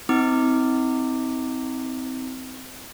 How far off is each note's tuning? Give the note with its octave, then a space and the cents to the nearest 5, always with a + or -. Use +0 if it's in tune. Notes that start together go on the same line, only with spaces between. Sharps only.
C4 -15 D#4 +40 D6 +0